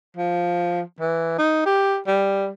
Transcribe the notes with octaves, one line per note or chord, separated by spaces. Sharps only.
F3
E3
D#4
G4
G3